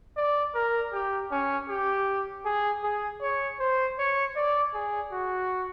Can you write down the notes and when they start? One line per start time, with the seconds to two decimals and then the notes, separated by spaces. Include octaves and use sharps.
0.17 D5
0.55 A#4
0.93 G4
1.32 C#4
1.69 G4
2.45 G#4
2.84 G#4
3.21 C#5
3.60 C5
3.99 C#5
4.36 D5
4.74 G#4
5.12 F#4